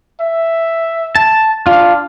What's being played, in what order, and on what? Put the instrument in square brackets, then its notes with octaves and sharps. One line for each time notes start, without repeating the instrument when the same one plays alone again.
[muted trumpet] E5
[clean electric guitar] A5
[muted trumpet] D4 [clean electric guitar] F4